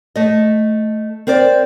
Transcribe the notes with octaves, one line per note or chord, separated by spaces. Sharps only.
A3 D#5
C4 A#4 C5 D5